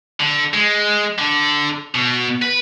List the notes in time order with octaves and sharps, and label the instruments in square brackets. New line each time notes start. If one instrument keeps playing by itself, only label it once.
[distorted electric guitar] D3
G#3
D3
B2
B4